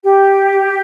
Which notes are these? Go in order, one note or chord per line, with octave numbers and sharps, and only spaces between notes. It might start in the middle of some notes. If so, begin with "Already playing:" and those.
G4